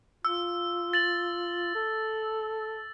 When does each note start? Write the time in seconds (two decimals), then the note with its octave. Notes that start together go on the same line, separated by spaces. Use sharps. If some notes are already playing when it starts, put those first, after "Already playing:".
0.25 F4 E6
0.93 A6 F#7
1.75 A4